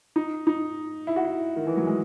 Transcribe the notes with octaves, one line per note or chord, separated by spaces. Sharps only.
D#4
D#4
E4
F#4
E4
D#3
E3
F#3
G#3